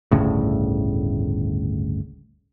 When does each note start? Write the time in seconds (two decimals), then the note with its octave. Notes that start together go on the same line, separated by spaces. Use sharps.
0.11 G1 D2 A2 C#3